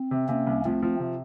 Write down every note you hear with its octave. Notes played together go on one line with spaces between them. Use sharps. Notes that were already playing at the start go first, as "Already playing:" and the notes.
Already playing: C4
C3
C3 A#3 C#4
C2
F3 A3 C4
F3
C3